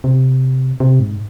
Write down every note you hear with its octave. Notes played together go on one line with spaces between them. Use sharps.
C3
C3
G#2